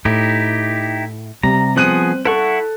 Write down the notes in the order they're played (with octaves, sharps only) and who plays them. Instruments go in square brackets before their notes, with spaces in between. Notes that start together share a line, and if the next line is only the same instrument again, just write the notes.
[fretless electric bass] A2 [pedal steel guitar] D#4 E4 G4
[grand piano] C3 [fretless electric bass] G3 [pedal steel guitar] A#5
[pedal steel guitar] F3 B3 G#4 [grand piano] C4 F#6 D#7
[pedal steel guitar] E4 F#5 C#6 [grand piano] A4